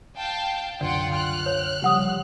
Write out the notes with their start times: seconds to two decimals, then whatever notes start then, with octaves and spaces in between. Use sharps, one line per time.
0.17 F5 G5 A5
0.81 C2 F#2 D3 F4 D5 F#5 G5
1.13 F6 F#6
1.46 C#5
1.82 C#3 F3 G3 G4 F#5 D#6